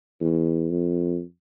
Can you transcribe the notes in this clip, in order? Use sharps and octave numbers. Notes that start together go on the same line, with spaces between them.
E2
F2